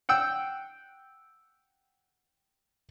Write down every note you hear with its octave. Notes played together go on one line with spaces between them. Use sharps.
F#5 G5 E6